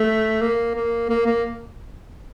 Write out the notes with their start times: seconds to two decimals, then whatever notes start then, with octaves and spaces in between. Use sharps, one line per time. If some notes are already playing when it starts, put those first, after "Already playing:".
Already playing: A3
0.41 A#3
0.75 A#3
1.09 A#3
1.26 A#3